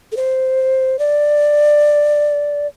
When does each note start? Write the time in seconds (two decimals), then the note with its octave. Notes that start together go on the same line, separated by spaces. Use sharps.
0.12 A4
0.17 C5
0.99 D5